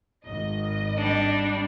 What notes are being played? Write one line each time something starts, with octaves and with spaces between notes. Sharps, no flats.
G#1 D#5
G3 D4